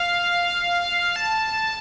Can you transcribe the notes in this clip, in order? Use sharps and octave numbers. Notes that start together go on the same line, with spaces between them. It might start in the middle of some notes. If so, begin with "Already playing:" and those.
Already playing: F5
A5